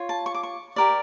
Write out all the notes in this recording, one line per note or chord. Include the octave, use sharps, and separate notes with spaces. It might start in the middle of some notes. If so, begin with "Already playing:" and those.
Already playing: F4 C#5
A5
C#6
D6
C#6
G4 A#4 D5